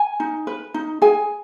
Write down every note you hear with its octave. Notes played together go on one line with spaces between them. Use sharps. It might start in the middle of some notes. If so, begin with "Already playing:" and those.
Already playing: G#5
D#4
B4
D#4
G#4 G#5